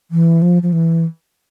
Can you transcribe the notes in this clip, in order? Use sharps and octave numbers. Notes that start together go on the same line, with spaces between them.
E3
F3
F3
E3